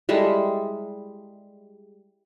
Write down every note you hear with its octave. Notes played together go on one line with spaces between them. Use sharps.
G3 G#3 E4 A4